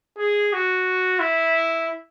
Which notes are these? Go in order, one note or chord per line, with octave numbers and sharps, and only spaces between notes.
G#4
F#4
E4